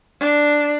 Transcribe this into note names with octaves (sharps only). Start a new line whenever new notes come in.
D4